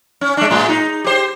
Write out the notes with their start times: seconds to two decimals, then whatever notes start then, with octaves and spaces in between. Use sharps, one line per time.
0.21 C#4
0.37 G#3 D4
0.51 A2 G#3
0.68 D#4
1.04 G4 C5